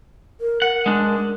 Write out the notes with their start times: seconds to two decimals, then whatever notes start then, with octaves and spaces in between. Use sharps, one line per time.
0.41 A#4
0.62 A#4 F#5
0.86 G#3 D4